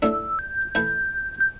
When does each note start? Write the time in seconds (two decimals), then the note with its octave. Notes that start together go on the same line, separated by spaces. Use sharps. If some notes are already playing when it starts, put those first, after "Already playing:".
0.02 A2 A3 D4 E6
0.39 G6
0.75 E3 A3 E4 G6
1.40 G6